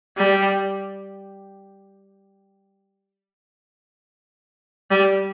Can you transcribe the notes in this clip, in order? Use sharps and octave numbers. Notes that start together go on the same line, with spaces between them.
G3
G3